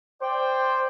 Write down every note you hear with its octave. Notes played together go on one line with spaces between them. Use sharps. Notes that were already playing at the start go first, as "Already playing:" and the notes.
C5 D5 G5